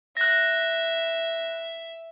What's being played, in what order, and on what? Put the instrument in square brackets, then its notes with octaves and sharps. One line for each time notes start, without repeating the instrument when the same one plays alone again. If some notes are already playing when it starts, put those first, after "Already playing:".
[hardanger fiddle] E5 [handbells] F#6 A#6